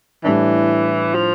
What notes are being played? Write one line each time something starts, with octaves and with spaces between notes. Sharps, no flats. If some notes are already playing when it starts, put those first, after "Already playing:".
A2 E3 G3 D4
F3